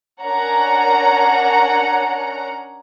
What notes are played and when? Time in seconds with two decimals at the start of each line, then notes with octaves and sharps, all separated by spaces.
0.22 C#4 D4 A#4 C#5 F#5 A#5